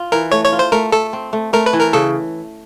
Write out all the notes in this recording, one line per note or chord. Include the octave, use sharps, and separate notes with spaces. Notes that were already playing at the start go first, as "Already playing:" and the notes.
Already playing: F4
E3 A#4
A3 C#5
C#5
F4
C5
A3 A#4
A3 A4
C4
A3
A3 A#4
B4
E3
A#4
C#3 A4